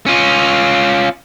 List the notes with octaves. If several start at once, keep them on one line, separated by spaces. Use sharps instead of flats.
C#4 F4